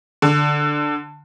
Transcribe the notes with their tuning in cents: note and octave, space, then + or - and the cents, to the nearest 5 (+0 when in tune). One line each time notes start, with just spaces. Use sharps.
D3 +5